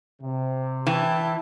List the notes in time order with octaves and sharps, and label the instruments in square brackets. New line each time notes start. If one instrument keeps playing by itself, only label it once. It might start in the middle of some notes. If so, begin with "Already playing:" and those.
[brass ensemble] C3
[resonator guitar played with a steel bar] E3 [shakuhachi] E4 [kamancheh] G5 A5